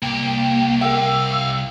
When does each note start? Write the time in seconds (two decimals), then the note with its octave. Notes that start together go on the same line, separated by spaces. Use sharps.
0.02 C2 A#3 G4 G5
0.81 A#4 E5 F5 G5 E6